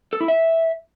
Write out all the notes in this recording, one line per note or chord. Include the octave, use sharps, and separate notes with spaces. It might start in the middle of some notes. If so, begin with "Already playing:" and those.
A4
E4
E5